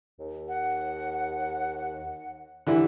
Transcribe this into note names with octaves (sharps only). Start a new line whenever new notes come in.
D#2
F#5
D3 E3 G3 E4